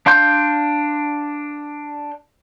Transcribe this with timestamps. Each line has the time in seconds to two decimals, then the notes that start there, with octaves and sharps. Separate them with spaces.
0.06 D4 F5 C6 G6